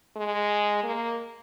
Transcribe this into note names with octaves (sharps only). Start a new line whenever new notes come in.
G#3
A#3